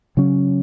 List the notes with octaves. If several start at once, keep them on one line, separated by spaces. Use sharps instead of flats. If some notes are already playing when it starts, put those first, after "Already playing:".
C#3 F#3 C#4